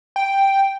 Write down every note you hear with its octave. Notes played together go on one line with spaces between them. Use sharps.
G5